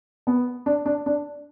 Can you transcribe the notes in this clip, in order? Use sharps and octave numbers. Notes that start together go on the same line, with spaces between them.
B3
D4
D4
D4